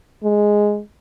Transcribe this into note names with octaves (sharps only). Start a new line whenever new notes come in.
G#3